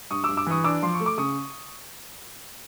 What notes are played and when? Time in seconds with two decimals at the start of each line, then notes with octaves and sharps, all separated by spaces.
0.11 G2 C#6 D#6
0.24 D6 E6
0.29 G2
0.37 D6 E6
0.46 E3 C#6 D#6
0.64 D4 D6 E6
0.82 F3 C6
0.94 C#6
1.00 A3
1.06 D6
1.18 C#3 C#6 D#6